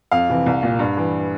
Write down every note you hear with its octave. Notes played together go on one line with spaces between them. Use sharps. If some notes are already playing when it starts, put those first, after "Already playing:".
F2 F5
C3 E3
C2
A#2
G2
E3